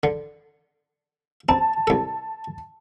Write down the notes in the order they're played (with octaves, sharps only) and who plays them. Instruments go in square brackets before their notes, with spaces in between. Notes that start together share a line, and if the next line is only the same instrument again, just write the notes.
[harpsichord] D3
[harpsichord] C4 [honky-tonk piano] A5
[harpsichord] C2 A4